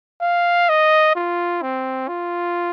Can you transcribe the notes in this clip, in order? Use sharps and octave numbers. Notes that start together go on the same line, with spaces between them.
F5
D#5
F4
C4
F4